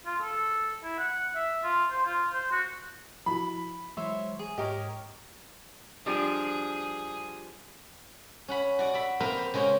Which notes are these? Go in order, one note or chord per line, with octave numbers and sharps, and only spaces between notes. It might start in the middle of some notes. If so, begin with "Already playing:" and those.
F4
A4
E4
F#5
E5
F4
C5
F4
C5
F#4
F3 E4 F#4 B5
E3 F#3 G#3 C5 C#5 E5
G#4
G#2 G4 A#4 C#5 D#5
F3 G3 D4 G#4
C#4 F#5 B5
F#4 D5 F#5
D5 E5 B5
A#3 C4 A#4 B4 E5 F5
C5
C#3 G#3 C4 G4 C#5 F#5